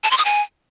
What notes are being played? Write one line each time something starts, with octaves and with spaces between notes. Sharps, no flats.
A5
C6
D#6
G#5